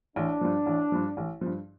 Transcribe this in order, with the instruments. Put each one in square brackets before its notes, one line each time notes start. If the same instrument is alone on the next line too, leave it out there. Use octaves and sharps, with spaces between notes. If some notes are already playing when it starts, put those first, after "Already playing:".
[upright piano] A1 [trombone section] D4
[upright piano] G2 F3
A1
G2 F3
A1
G2 F3